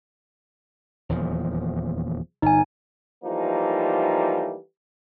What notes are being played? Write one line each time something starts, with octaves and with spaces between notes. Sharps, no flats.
D#1 E2 F3
G1 D#4 G#5
E3 F3 G3 A3 A#3 D#4